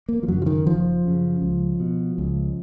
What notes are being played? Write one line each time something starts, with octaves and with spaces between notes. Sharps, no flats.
A#3
F3
F#2 C#3 F#3
F3
D#3
F#1 F3
F#2 C#3
C#2
B2
C#2